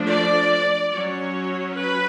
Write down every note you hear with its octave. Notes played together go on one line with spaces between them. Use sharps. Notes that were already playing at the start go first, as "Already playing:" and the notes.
Already playing: F3 A3 D4
D5
F#3 C#4 C#5
B4